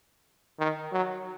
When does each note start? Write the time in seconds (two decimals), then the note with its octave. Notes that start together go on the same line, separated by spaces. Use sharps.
0.59 D#3
0.92 F#3